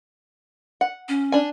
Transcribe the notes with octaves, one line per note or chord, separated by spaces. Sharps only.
F#5
C#4
D4 G#5